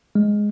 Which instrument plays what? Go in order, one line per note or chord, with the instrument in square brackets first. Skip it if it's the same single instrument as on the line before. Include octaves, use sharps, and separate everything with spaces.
[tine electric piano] G#3